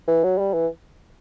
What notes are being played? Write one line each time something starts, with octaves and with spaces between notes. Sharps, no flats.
E3
F#3
G3
E3